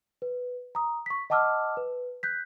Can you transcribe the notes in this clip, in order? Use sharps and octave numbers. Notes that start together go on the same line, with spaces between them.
B4
A#5 D#6
C#6 B6
D#5 F#5 A5 D6 E6 F6
B4
F#6 G6 B6